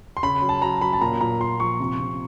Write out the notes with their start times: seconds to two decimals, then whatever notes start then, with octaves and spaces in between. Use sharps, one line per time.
0.17 C6
0.23 C#3 B5
0.42 F#3
0.49 A5
0.62 F#3 A#5
0.81 F#3 B5
0.93 A5
1.01 A#2 A#5
1.21 A#2 A#5
1.40 A#2 C6
1.60 F3 C#6
1.80 C3
2.00 C3